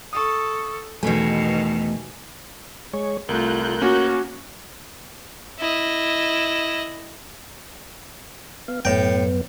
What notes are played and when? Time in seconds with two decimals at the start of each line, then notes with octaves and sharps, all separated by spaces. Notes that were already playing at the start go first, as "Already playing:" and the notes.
0.13 A4 C#6 D#6
1.03 E2 B2 D#3 A3 G#5
2.93 G#3 C#5
3.29 C2 A3 F4 A#4 F#6 G6
3.82 A#3 C#4 F#4
5.59 E4 D#5
8.68 B3 F5
8.85 F#2 A2 B3 G5